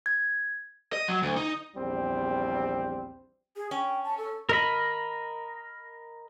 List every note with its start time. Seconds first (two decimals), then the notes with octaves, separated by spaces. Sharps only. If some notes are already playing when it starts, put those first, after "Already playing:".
0.06 G#6
0.93 D#5
1.08 F#3
1.22 D2
1.36 D#4
1.74 A#1 E2 G3 C4
3.56 G#4
3.71 C#4 G5
4.04 A5
4.18 A4
4.49 A#4 D#5 B5